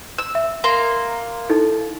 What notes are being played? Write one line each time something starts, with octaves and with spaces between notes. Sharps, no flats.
E6
E5
A#3 A#5 C6
D#4 E4 A4